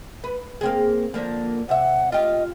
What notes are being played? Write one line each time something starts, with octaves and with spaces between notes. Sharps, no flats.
B4
A#3 C4 G#4
D3 F3 A#3
C3 E5 F#5
F4 G4 D#5